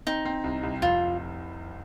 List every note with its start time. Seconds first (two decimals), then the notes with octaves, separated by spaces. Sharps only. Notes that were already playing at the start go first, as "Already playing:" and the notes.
0.07 C4 D#4
0.25 C4
0.44 C2
0.63 C2
0.81 F1 F4